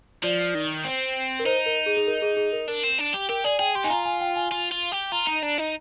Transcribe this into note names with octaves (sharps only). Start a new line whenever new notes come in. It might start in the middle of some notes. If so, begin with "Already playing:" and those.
F3 D5
D#3
C4
A#4
D#4 C5
A#4
G#4
G#4
A#4
G#4
G#4
A#4
D4 A#4
C4
D4
G4
G4 A#4
G#4 D5
G#4 G5
G4 C6
D#4 G#5
F4 A#5
G#5
G5
G#5
F4
F4
G4
F4 A#5
D#4
D4
D#4